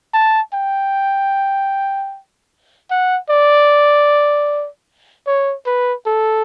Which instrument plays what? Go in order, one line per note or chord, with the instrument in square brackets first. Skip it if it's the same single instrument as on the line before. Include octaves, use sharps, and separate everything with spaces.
[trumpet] A5
G5
F#5
D5
C#5
B4
A4